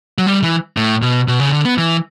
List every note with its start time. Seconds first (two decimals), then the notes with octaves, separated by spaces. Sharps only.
0.18 F#3
0.27 G3
0.43 E3
0.77 A2
1.02 B2
1.28 B2
1.40 C#3
1.52 D3
1.65 B3
1.78 E3